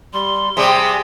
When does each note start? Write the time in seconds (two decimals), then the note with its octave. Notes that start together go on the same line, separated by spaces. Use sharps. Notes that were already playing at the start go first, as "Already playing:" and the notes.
0.14 G3 C6
0.57 C3 G3 G#4